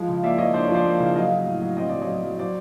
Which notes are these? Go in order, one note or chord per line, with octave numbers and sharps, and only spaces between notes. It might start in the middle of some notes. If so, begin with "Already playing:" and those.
Already playing: F3 G#3
C#3
A#3 D5 E5
F3 C#5 D#5
D4 C5 D5
C#5
F3
C5 D5
A#3
C#3
F#3 D#5 F5
F#3
A2
F#3
C4 D#5
F#3 D5
C#5 D#5
F#3
F#3
F#3 C5 D5